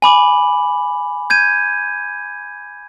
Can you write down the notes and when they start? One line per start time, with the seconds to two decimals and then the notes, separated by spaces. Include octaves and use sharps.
0.02 G#5 B5 D6 F#7
1.30 G6 G#6 D#7